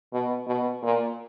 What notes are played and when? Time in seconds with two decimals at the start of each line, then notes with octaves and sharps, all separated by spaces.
0.13 B2
0.47 B2
0.83 A#2